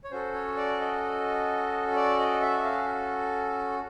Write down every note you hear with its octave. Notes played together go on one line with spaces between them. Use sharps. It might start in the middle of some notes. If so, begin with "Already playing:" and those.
C#5
C#4 F#4 A4 C5
C#5
D5
D#5
D5
D#5
E5
F5